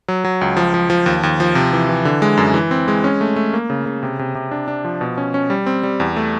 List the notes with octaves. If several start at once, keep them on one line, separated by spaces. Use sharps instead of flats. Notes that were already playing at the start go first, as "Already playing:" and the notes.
F#3
F#3
C#2
F3
F3
F3
D#2
D#2
F3
C3
E3
E3
D3
G#3
F#2
E3
C4
G#3
C#4
A3
A3
A#3
C#3
C#3
C3
C3
C3
D4
D4
F3
B2
C#4
C#4
G3
C4
G3
E2
A3